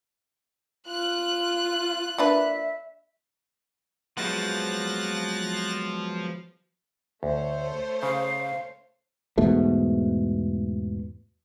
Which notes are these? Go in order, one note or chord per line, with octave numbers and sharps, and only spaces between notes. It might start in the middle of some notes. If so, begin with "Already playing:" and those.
F4 F#6
A#3 D4 B4 E5
F3 F#3 G#3 B3 F#6 A6 A#6
D2 A3 C5 C#5
C#3 F5
E2 G#2 B2 A3